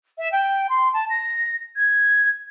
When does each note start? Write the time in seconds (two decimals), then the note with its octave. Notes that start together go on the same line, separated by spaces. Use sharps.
0.18 E5
0.32 G5
0.69 C6
0.94 A5
1.10 A#6
1.76 G#6